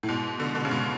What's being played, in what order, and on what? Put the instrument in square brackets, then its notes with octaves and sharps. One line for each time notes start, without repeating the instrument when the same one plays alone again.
[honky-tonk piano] A2
G#2 B2
B2 D3
B2 D3
C#3
G#2 B2